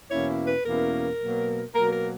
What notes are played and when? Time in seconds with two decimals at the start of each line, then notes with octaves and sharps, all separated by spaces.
0.09 E2 B2 A#3 C#4 E4 C#5
0.46 B4
0.63 E2 B2 A#3 C#4 E4 A#4
1.18 B2 F#3 A#3
1.73 B2 F#3 A#3 A#4
1.91 A#4